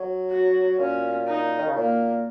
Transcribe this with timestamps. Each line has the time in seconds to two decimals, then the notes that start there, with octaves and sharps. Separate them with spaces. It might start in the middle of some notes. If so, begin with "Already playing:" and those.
Already playing: F#3
0.30 F#4
0.79 A#2 C#4
1.27 D#4
1.58 D#3
1.67 C#3
1.76 A#2 A#3